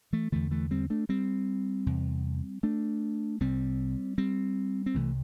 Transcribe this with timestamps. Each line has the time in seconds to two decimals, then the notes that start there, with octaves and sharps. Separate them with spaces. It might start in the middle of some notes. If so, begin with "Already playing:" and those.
0.13 E3 A3
0.32 E2 D3 E3 A3
0.51 E3 A3
0.71 G3 C4
0.90 A3 D4
1.09 G3 C4
1.86 E2 C3
2.63 A3 D4
3.40 C2 C3 G3 C4
4.18 G3 C4
4.86 C4
4.95 C2 C3 E3 A3